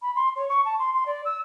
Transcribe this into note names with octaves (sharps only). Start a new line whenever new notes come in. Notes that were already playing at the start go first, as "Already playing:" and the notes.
B5
C6
C#5
C#6
A5
C6
C6
D5
E6